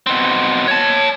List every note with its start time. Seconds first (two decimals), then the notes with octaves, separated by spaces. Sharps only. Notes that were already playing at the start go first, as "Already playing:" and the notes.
0.07 B2 C4
0.68 C#5 A5